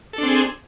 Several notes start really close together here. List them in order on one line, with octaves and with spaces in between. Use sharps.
A4 D4 C4 G#4